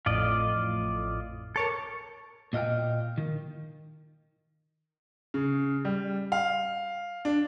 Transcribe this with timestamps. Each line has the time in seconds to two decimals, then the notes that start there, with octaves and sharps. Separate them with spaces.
0.06 A1 F2 A2 F4 D5 D#5
1.56 A4 A#4 C#5 A5 D6
2.53 A#2 D#5 F5 G5
3.18 D#3
5.34 C#3
5.85 G3
6.32 F5
7.25 D4